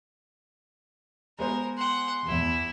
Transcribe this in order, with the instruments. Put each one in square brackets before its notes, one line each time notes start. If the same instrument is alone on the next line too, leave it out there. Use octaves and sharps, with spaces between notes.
[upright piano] G#3 B3 C5 [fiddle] A#4
[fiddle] F#5 [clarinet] C6
[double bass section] E2 [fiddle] E4